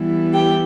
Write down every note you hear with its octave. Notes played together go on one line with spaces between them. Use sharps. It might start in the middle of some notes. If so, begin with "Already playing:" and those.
Already playing: E3 G3 B3 E4
G4 G5